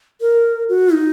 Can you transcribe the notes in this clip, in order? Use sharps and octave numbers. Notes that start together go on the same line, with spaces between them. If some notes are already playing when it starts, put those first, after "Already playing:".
A#4
F#4
D#4